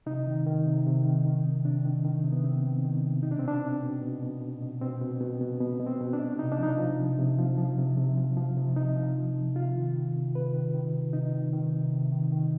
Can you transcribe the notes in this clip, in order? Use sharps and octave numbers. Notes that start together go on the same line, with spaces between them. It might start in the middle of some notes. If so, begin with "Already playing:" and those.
C3 D#4
D#3
D#3
C3
C3
D#3
D#3
C3
C3 D4
D#3
D#3
C3
B3
C3 C4
D#3
D#3
C3
B2 D#4
D4
C4
B2 D4
B2
B2
B2
B2
B2
B2
B2 C4
B2
B2
B2
B2 B3
B2
C4
B2
D4
B2
C3 D#4
D4
F3 D#4
F3
C3
C3
F3
F3
C3
C3
F3
F3
C3
C3 D#4
F3
F3
C3
C3 F4
D#3
D#3
C3
C3 B4
D#3
D#3
C3
C3 D#4
D#3
D#3
C3
C3
D#3
D#3